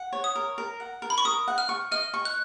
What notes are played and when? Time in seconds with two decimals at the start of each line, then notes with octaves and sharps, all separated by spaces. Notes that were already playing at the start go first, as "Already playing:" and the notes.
Already playing: F#5
0.12 C#5
0.24 D#6
0.35 A#4
0.58 A#4
0.80 F#5
1.02 A#4
1.10 B5
1.18 C#6
1.25 A#4 D#6
1.48 F#5
1.58 F6
1.69 C#6
1.91 D#5 F6
2.14 C#6
2.25 F#6